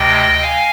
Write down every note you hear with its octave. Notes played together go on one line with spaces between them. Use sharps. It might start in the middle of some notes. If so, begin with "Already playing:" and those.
Already playing: D2 C3 D#5 G5
F5 G#5